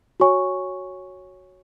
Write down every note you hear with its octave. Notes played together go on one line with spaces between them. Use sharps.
F#4 C#5 G#5 C#6